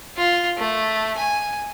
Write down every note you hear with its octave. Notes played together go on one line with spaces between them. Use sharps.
F4
A3
G#5